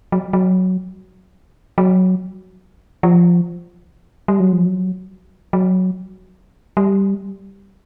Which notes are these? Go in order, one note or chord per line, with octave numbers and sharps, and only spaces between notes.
F#3
F#3
F#3
F3
G3
F#3
F3
F#3
F#3
G3